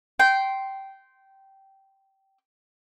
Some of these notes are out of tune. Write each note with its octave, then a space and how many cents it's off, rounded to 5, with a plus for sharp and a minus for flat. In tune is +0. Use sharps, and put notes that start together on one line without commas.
G5 -15 C6 +0